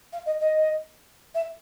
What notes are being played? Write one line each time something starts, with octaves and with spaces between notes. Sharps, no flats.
F5
D#5
D#5
E5